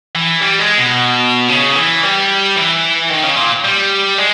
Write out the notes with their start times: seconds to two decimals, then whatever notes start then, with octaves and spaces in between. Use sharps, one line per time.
0.15 E3
0.41 G3
0.59 G#3
0.78 B2
1.49 C#3
1.75 E3
2.03 G3
2.56 E3
3.10 D#3
3.23 C#3
3.37 A#2
3.65 G3
4.18 G#3